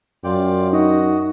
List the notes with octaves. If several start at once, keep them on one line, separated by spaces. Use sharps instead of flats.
F#2 F4 D5 G5
D#4 F#4 D#5